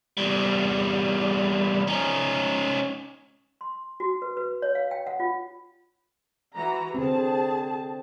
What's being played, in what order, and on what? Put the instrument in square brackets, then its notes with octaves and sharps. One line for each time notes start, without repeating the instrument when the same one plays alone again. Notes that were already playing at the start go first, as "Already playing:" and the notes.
[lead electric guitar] E2 G3
C#4 D#4
[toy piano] C6
F#4
B4
B4
C#5
F5
G5
F#5
F4
[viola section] E3 F#4 A#5
[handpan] D3 C4 [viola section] G#4 A5